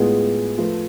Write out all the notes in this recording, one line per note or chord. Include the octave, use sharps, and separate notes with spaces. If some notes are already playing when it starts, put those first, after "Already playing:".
Already playing: A2 G#3 B3 F4 G#4
F3 A3 F4 B4